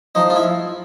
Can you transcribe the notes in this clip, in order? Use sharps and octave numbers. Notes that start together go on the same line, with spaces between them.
F3 D#4
F4
E4